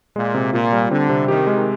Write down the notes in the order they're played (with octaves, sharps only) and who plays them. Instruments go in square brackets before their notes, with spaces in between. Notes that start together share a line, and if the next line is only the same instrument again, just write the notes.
[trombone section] A#2 [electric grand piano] G#3
[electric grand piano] C3
[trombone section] A#2 [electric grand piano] F4
[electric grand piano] G3
[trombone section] D3 [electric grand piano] C4
[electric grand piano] C3
[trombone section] D#3 [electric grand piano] G4
[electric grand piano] G#3